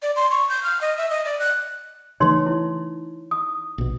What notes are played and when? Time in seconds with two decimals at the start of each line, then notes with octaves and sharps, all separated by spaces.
0.02 D5
0.16 C6
0.31 C#6
0.49 G6
0.63 F6
0.81 D#5
0.97 E5
1.10 D#5
1.25 D5
1.39 F#6
2.20 C#3 E3 A3 D#4 C#5 C6
2.46 E4
3.31 D#6
3.78 A#1 B2